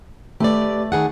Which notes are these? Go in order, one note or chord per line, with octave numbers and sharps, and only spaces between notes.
A3 G4 B4 D5
D#3 G#4 F#5